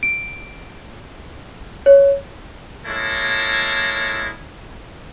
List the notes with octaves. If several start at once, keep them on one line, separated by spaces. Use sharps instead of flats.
D7
C#5
G#3 A#3 E4 A4 C#5